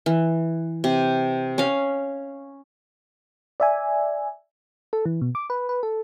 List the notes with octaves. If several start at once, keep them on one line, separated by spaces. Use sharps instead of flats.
E3
C3
C#4 F5
D5 E5 G#5
A4
E3
B2
D6
B4
B4
A4